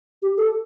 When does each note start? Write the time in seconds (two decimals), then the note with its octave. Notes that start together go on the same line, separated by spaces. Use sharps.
0.22 G4
0.38 A4